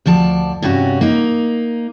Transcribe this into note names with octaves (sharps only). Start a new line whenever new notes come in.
D2 F3 D5 A5
G2 C3 C#4 F#4
A#3 D#4